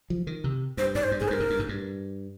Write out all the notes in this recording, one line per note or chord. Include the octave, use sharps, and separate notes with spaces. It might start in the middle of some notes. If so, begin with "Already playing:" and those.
F3
D#3
C3
G2 C5
G#2 D5
C5
G2
G#2 G#4
G2 A#4 C5
G#2
G2
G#2
G2